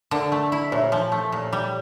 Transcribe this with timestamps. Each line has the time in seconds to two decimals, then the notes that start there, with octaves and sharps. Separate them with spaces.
0.11 D3 A#4 D5
0.32 A3
0.52 E4
0.72 A#2 C#5 E5
0.92 F3
1.12 A3
1.32 A#2
1.53 G3